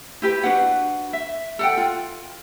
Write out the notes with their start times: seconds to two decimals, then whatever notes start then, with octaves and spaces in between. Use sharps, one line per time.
0.22 E4 G4 B4
0.43 D4 F#4 B4 F#5
1.13 E5
1.59 A4 F#5 G5
1.77 F4